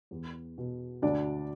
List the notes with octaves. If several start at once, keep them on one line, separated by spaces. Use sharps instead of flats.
E2
B2
D2 D4 D5